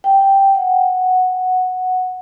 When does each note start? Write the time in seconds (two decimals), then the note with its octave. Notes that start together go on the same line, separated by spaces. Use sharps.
0.04 G5
0.55 F#5